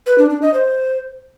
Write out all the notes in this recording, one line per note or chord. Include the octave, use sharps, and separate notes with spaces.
B4
D4
D4
D#5
C5